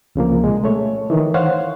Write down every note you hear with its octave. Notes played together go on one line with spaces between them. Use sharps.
C2 C#3 F3 A#3
A#2 G#3
A3 C#5
D#3 E3
C5 C#5 F5 F#5